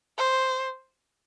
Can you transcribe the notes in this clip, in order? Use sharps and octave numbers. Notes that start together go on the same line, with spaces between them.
C5